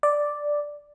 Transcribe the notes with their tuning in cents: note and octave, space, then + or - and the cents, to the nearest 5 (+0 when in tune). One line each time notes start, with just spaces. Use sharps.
D5 +0